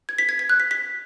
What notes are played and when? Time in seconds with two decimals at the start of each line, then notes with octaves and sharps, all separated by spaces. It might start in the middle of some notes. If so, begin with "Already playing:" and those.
0.09 G#6
0.18 B6
0.29 G#6
0.39 G#6
0.49 F#6
0.60 B6
0.71 B6